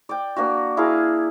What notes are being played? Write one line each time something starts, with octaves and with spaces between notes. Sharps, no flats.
D5 G5
A#3 D4 F#4
E4 G#4 A#4 F5